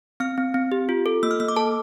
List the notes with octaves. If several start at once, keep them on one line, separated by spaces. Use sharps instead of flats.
C4 F6
C4
C4
G4
F4
A4
A#3 E6
F6
A#3 E6
D6
A4 A5